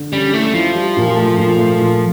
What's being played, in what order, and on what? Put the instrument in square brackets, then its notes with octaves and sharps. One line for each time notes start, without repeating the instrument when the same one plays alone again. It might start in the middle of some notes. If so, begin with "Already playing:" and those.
Already playing: [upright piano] D3
[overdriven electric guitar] G3 [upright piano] C#4
[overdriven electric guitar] A3 [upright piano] E4
[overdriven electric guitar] F3 [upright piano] E4
[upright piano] G3
A#2
A3
A#2
A3
A#2